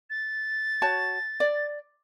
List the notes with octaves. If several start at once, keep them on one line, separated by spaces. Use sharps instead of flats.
A6
F#4 C#5 A5
D5